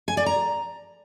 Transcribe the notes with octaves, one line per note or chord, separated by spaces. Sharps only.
G#5
D5
A#5